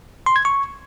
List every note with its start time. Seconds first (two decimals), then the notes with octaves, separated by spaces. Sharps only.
0.26 C6
0.36 G#6
0.45 C#6